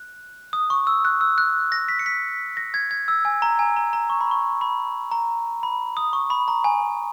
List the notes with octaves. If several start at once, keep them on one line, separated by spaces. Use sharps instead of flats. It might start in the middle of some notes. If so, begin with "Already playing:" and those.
Already playing: F#6
D#6
C#6
E6
F#6
E6
F#6
A#6
B6
C#7
B6
A#6
G#6
G#6
E6
G#5
A#5
G#5
A#5
A#5
C#6
B5
C#6
B5
A#5
B5
D#6
C#6
B5
A#5
G#5